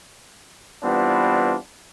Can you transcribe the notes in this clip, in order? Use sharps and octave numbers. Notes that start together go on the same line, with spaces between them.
E3 G3 B3 C4 D4 F4